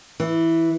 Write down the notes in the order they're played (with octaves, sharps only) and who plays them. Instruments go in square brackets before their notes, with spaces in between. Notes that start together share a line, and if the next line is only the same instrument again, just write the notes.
[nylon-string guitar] E3